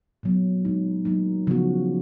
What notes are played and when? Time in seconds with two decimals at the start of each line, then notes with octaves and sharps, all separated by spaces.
0.23 A#2 F#3 B3
0.65 A#2 G#3 D#4
1.05 F#3 A#3 D#4
1.47 C#3 F3 B3 F#4